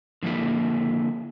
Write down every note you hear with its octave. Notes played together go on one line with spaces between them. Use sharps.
D3 F3 A#3 E4